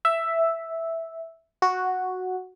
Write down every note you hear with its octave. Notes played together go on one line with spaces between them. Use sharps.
E5
F#4